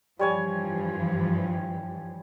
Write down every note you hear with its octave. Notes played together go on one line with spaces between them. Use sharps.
G2 E3 F3 G3 C#5 G#5